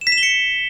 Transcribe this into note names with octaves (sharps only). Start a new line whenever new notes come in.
E7
B6
E7
G7
C#7